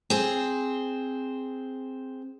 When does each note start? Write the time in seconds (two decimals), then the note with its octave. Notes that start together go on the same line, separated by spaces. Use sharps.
0.10 C4 G#4